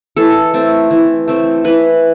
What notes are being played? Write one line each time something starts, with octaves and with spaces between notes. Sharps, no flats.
E3 A4
A3 C4
E3
A3 C4
E3 B4